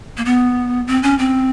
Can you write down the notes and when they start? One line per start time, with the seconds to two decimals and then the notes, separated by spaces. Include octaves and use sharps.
0.17 A#3
0.25 B3
0.87 C4
1.03 C#4
1.19 C4